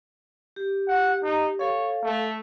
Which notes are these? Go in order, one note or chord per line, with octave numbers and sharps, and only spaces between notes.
G4
F#5
D#4
A4 C#5 F5
A3